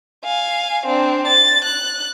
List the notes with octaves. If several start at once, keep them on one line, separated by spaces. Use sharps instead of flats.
F5 G#5
C4 D4
A6
F#6